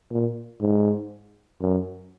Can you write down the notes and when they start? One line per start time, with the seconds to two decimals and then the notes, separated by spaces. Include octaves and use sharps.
0.11 A#2
0.61 G#2
1.62 F#2